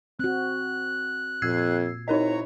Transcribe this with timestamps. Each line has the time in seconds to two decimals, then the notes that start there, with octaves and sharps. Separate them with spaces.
0.19 C4 F#4 F#6
1.42 F2 A#2 E6 G#6 C7
2.08 C4 D#4 E4 A#4 C#5 D#5 A#5